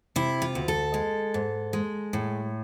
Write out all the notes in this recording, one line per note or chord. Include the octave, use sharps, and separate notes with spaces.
C3 E4
F4
D2
A4
G#3
G#2
G#3
A2